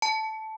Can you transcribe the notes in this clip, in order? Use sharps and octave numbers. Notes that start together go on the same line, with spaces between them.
A5